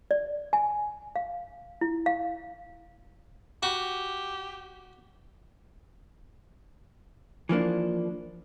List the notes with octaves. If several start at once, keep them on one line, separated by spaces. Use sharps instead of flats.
D5
G#5
F5
E4
F5
F#4 G4
E3 F3 A#3 D4